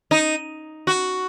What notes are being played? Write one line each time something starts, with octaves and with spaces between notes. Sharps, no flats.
D#4
F#4